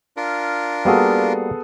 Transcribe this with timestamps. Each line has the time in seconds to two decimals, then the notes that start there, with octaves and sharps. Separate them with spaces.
0.17 D4 F4 A#4
0.85 G3 A#3 B3 F#4 G#4 A4